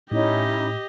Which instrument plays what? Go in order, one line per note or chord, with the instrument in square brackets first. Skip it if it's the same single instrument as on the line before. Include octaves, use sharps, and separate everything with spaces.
[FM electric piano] A2 [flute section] C#4 D#4 E4 [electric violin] G4 D#5